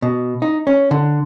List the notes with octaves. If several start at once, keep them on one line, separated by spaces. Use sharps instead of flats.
B2
D#4
C#4
D3